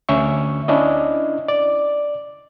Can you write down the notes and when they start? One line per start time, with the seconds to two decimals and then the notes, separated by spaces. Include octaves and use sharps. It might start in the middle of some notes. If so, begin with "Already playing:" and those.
0.09 D2 C#4 E5 C#6
0.68 C#4 D4 E4 D#5
1.48 D5